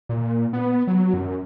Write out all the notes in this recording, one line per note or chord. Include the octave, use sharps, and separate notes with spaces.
A#2
B3
F#3
F#2